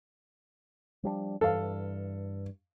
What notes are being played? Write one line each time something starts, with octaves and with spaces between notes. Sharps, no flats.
F3 G3 D4
G2 E3 A4 F5